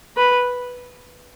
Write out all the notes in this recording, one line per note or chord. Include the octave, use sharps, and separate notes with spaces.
B4